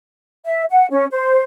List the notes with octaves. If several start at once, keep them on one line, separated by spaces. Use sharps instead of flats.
E5
F#5
C#4
C5